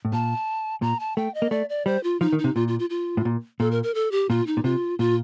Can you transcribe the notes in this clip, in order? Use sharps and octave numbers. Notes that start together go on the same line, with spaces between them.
A2
A#2 A5
A#2 A#5
A5
A3 G5
D#5
A#3
A3 D5
D5
G3 C5
F4
F3 D#4
D#3
D#4
C3
A#2 F4
F4
F4
F4
A2
A#2
A#2 A4
A#4
A#4
A4
G4
A#2 F4
D#4
A#2
C3 F4
A#2 F4